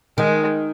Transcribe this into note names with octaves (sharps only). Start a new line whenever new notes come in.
D#3 G#3